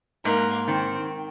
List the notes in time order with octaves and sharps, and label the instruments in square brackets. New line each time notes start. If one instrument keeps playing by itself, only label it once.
[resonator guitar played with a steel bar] G#2 [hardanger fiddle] A#3
[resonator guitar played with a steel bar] D#3 [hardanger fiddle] C4